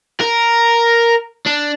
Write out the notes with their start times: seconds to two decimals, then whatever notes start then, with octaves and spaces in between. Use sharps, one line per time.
0.21 A#4
1.47 D4